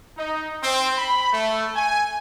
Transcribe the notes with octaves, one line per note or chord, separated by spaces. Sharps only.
D#4
C4
B5
A3
G#5